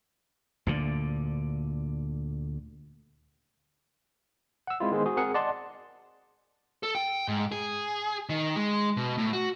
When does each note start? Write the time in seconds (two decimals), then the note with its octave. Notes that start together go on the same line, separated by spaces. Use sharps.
0.67 D2 A#2 D3
4.67 F#5 E6
4.80 G#3 C4 E4 F4
4.92 D#3 G#3 B3 G#4 C5
5.05 F#4 G#4 C5
5.17 C4 G#4 A#4 F#5 C#7
5.34 D5 D#5 F#5 A5 C6
6.83 A4
6.95 G5
7.28 G#2
7.52 G#4
8.29 D#3
8.56 G#3
8.97 B2
9.18 A2
9.33 F#4